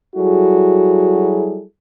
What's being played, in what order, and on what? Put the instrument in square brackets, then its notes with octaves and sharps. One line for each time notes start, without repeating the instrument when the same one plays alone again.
[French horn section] F#3 G3 E4 F#4 G#4 A4